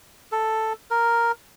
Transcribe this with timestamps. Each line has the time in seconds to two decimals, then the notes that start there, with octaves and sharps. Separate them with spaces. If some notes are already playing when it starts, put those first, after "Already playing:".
0.32 A4
0.91 A#4